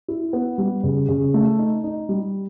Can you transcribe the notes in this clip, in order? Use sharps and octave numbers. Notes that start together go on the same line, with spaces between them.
E4
B3
G3
C#3
C#3
A3
D#4
D#4
G3